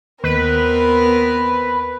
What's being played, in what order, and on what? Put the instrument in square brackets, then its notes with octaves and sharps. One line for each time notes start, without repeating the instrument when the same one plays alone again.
[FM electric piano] D#2 B6 [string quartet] B3 C4 A#4 [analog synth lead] B4